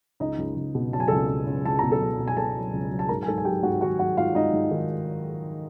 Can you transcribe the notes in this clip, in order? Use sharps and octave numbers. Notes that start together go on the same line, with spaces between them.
C#2 D#4 D#5
C#2
C#2
B2
F#3 A5
G#5
C#2 A4 A5
C#2
C#2
C#2 A5
B2 A#5
A4 A5
C#2
B2
G#5
B2 A4 A5
F#3
C#2
F#3
A5
G#2 A#4 A#5
G#5
G#2 A4 A5
G#5
F#3 G4 G5
G#2 F#4 F#5
D#3 F#4 F#5
G#2 F#4 F#5
G#2 F4 F5
G#2 D#4 D#5
G#2
D#3